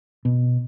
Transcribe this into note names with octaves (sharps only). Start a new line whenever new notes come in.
B2